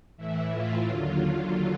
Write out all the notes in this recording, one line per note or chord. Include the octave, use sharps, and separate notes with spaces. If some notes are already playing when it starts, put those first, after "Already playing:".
A2 E3 E4
F4
D#2 D3 F#3